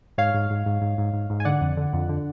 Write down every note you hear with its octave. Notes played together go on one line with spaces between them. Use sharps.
G#2 C#5 F5
G#2
G#2
G#2
G#2
G#2
G#2
G#2
G#5
D3 D5 F#5
F2
D3
F2
D3